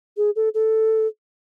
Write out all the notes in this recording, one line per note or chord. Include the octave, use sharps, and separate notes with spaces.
G#4
A4
A4